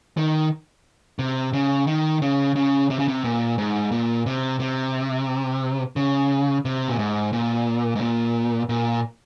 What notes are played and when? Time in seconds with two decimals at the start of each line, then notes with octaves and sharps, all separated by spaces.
0.17 D#3
1.19 C3
1.53 C#3
1.87 D#3
2.22 C#3
2.56 C#3
2.90 C3
2.99 C#3
3.08 C3
3.24 A#2
3.58 G#2
3.92 A#2
4.26 C3
4.60 C3
5.96 C#3
6.65 C3
6.88 A#2
6.99 G#2
7.33 A#2
7.96 G#2
8.01 A#2
8.69 A#2